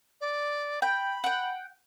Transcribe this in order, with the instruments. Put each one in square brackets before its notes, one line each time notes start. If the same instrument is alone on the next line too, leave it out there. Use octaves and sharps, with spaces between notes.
[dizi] D5
[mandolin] G5 [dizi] B5
[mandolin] F#5 G5